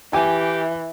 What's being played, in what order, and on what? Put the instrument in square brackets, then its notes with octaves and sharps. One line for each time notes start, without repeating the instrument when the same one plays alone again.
[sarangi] E3 [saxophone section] G4 [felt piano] G#5